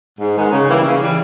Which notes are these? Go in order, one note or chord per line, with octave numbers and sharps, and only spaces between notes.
G#2
D#3 G#3 B3
C#3
E3 G3 A#3 E4
C#3
E3 G3